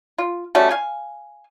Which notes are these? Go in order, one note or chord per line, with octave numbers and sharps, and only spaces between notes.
F4
G3 A3 C#4 F#4
F5 G#5